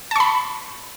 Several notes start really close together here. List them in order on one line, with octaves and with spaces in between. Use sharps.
A5 C#6 B5